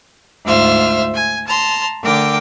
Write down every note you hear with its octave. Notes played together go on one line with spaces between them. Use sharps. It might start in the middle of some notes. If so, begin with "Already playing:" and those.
D2 G#2 F4 C5 E5 F6
G#5
A5 A#5 C6
D3 A3 A#4 G5 D6